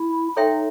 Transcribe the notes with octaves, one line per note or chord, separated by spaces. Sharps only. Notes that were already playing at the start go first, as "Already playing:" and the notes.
Already playing: E4
D#4 A4 C#5 E5 G5 C6